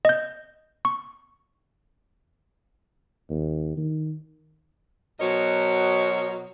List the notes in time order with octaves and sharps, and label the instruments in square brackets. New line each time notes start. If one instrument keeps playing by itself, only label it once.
[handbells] D#5 G6
C#6
[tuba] D#2
D#3
[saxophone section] B2 F#3 A#4 C5 C#5 D#5